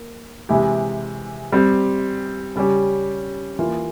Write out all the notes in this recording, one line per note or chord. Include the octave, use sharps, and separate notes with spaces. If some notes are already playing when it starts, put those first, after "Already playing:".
Already playing: A#3
C3 E3 G#3 E4 G4
G3 C4 G4
C#3 G3 C#4 G4
E3 A#3 F4